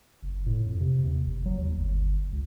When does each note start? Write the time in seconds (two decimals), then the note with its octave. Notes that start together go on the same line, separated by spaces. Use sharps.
0.23 F#1
0.46 A2
0.66 F2
0.80 C3
1.03 D#2
1.25 F#1
1.46 F#3
1.58 D#2
1.76 G1
2.32 C#2